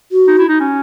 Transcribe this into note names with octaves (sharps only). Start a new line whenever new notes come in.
F#4
D#4
E4
D#4
C#4